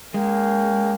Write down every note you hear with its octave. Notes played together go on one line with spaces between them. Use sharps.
G#3 A#3 C#4 G5